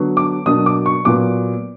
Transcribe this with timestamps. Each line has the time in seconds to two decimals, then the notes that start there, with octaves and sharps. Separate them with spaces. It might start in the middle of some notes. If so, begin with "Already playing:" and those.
Already playing: D3 F#3 B3
0.17 D6
0.46 B2 F#3 A#3 D4 D#6
0.66 D6
0.86 C#6
1.05 A#2 F#3 B3 D6